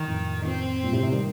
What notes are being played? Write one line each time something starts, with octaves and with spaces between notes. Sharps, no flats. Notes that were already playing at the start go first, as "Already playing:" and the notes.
Already playing: D#3
F2 A2
C4
G2 A#2
A2 C3
A2 C3
D#3 G3